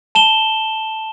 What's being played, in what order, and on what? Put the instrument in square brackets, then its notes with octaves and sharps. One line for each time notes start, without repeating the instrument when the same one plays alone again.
[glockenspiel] A5 E7 G7